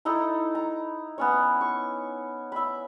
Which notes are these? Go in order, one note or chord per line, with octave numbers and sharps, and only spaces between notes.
D#4 E4 A4 A#5
A#5
B3 C#4 C#5
C#6
E5 B5